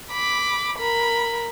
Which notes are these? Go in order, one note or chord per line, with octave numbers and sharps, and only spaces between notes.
B5 D6
A#4 B5